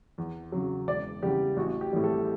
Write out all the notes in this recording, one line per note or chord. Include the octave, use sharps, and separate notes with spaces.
E2
C#3 F#3
E1 D5
E2 C#3 G3 G4
A1 F#4
G4
A2 E3 G3
A4